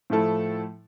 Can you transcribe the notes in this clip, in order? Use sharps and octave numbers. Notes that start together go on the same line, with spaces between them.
A2 F3 A3 E4 A4